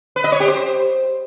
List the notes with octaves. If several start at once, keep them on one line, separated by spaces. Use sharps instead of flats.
B4
D#5
C#5
G4
C5